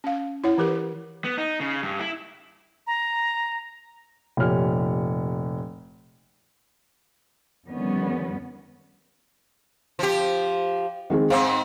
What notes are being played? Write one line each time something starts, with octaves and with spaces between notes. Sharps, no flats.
C#4 F5
E4 C#5 F#5
E3 G4 A#4 B4
B3
D#4
C#3
G2
E4
A#5
F1 A#2 G4 C#5 F6
F2 D3 D#3 G3 B3 C#4
F3 G4
D#3 G#3 C4
G#2 C4 F5